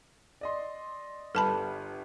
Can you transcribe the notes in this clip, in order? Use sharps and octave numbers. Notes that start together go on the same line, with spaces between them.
D5 D#5 C6
G1 G3 A4 B4 A5 B5